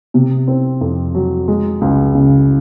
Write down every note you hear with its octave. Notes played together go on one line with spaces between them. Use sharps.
C3
C4
F2
F#3
G#3
C#2
C#3